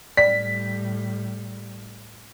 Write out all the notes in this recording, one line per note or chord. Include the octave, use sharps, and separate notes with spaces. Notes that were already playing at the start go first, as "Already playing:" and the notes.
A2 G3 D5 B6